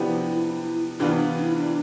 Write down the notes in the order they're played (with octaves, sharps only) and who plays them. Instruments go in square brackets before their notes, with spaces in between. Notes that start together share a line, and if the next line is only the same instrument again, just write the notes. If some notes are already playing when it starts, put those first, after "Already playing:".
Already playing: [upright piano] C3 F3 B3 D4 G4 [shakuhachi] E4
[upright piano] C3 E3 B3 F4 [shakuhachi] D4
[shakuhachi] D4
E4
D4